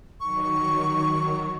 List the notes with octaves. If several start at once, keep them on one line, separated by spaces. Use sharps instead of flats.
D#3 F#3 C#6